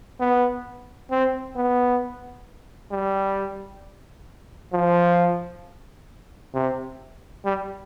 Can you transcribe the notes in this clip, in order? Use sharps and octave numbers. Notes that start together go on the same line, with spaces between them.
B3
C4
B3
G3
F3
C3
G3